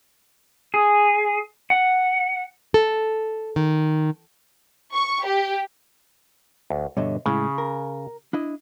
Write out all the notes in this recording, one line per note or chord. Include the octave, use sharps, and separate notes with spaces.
G#4
F#5
A4
D#3
C#6
G4
D2
G2 B2 D3 C#5 D#5 E5
A2 C#3 G#3 E4
A#4
D4 E4 D#5